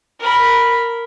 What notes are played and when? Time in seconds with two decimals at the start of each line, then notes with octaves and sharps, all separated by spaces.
0.20 A#4 B5